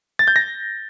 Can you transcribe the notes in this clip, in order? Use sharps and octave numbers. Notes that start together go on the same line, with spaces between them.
A6
G6
A#6